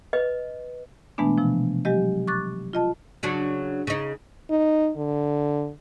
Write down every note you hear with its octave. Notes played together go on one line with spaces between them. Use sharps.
B4 D#5
B2 E3 G#3 A3 B3 D4
C3 F3
F#3 G#3 G4 D#5
C#6 D6 F#6 A6
F4 D#5 A5
C#3 F#3 D4
C#3 D#4
D#4
D3